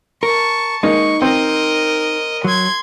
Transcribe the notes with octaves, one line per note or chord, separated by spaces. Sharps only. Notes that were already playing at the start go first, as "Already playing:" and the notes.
A#4 A5 C#6
G#3 A#3 D#4 C#6
C4 A#4 D#5
F#3 C6 G#6